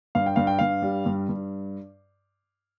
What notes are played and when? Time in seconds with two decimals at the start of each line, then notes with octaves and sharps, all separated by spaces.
0.15 G2 F5
0.26 G5
0.36 G2 F5
0.47 G5
0.59 G2 F5
0.82 G3
1.06 G2
1.29 G2